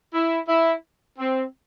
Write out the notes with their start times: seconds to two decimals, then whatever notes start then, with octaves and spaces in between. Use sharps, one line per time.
0.14 E4
0.49 E4
1.19 C4